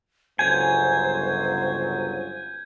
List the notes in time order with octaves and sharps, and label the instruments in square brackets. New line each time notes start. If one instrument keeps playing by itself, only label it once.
[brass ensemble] G1 C#2 F#3 [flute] C5 [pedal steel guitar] G#5 [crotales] G6 G#6